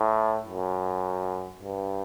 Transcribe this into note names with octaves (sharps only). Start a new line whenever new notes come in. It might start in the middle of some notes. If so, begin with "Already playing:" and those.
Already playing: A2
F#2
G2